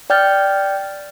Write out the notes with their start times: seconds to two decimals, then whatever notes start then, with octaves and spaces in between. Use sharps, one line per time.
0.10 D5 G5 F6 G6 A6